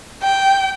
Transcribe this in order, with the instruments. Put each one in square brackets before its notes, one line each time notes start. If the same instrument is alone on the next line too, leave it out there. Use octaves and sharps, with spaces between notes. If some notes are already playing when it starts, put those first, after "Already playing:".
[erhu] G5